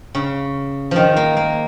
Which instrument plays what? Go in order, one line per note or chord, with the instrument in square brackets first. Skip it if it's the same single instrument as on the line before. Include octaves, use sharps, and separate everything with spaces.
[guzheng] C#3
D#3 F3
A#3
A#3